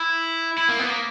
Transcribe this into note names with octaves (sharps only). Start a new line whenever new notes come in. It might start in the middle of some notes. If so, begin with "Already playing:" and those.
Already playing: E4
E4
A#3
B3
A#3